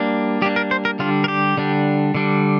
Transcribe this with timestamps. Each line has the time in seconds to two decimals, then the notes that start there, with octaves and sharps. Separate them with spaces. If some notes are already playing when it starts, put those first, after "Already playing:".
Already playing: G3 A#3 D4
0.42 G3 A#3 D4 G4
0.56 A#4
0.71 C5
0.85 A#4
0.99 D3 G3 D4 F4
1.24 A#4
1.28 G4
1.57 D3 G3 D4
2.15 D3 G3 D4